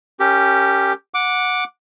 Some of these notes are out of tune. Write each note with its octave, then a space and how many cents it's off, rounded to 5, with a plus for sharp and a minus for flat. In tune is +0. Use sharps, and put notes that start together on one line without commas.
C#4 +0 G4 +0 A#4 -35
F#5 -15 D6 +0